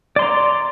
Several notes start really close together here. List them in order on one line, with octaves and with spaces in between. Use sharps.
D5 C6 A#5